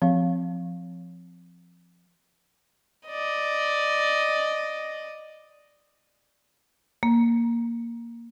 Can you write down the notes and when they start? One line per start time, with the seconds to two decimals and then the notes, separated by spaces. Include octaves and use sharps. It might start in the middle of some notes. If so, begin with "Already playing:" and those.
0.02 F3 C4 F5
3.07 D5 D#5
7.03 A#3